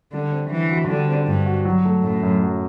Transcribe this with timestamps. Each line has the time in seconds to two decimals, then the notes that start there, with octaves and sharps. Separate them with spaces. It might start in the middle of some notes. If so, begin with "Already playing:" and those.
0.12 D3 G3
0.32 C4
0.51 D3 E3
0.70 F#4
0.89 D3 G3
1.09 C4
1.27 G2 D3
1.46 F#4
1.65 F#3
1.85 A3
2.03 F#2 A2
2.23 F#2
2.42 F#3